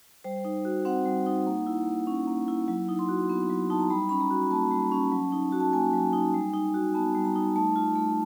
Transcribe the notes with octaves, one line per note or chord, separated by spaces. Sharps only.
G3 C5
D#4
F#4
C4 F#5
G3
D#4
A#3
E4
A#3
C#4
A#3
E4
F#3
D#4
C6
F#4
B3
F#3
D#4 A5
A#5
G3 B5
C#4 B5
A#5
F#4
A#3 A5
G3
C#4
F#3
D#4
F#4
A5
A#3 G#5
F#3
D#4
G3
D#4
F#4
B3 A5
G3
A#5
D#4
A3 A5
F4
A3